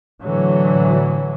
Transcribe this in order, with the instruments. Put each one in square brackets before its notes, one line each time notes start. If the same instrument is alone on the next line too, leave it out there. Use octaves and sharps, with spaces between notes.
[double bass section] A2 D3 E3 F#3